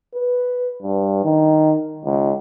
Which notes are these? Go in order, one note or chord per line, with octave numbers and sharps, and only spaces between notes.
B4
G2
D#3
C#2